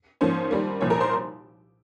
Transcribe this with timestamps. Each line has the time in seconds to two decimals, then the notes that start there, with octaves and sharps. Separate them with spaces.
0.21 G#2 F3 A#3 C#4 C5
0.51 D#2 D#3 G3 A#3
0.81 C2 A#2 F3 C#5
0.90 A#4 A#5
1.00 C5 C6